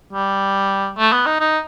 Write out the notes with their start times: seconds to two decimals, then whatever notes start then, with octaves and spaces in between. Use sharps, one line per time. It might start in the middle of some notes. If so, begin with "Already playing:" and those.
0.13 G3
0.98 A3
1.12 B3
1.26 D#4
1.40 D#4